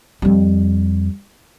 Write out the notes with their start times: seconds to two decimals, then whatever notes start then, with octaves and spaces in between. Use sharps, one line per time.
0.22 F2 G3